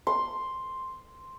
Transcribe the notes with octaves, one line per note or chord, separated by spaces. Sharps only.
C6